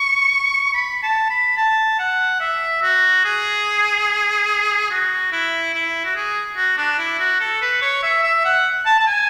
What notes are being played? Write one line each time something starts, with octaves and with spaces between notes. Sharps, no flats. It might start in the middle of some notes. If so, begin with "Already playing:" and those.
Already playing: C#6
B5
A5
B5
A5
F#5
E5
F#4
G#4
F#4
E4
E4
F#4
G#4
F#4
D4
E4
F#4
A4
B4
C#5
E5
E5
F#5
A5
A5
G#5